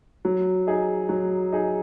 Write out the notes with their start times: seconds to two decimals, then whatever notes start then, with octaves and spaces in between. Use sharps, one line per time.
0.25 F#3
0.67 D#4 G#4
1.09 F#3
1.53 D#4 G#4